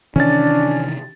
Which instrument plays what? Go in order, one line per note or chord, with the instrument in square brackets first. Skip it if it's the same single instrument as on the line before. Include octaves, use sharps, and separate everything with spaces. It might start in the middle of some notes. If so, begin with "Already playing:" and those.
[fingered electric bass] C3 D#3 E3 [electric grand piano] C#4 A6 [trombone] D4